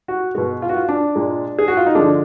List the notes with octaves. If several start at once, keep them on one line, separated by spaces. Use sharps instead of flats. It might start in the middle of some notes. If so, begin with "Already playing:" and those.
F#4
B2 G#3 F#4
F4
F#4
F4
D4
A#2 G#3
G#4
F#4
F4
D#4
D3 F3 G#3 D4